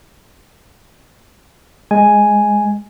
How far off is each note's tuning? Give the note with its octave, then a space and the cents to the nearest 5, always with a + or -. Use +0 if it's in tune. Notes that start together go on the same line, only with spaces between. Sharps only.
G#3 +0 G#5 +0